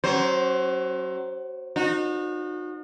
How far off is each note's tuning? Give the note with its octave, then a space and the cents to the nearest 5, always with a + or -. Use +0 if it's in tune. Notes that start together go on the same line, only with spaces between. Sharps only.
F#3 +25 C#4 -25 C5 +0
D#4 -30 F#4 -35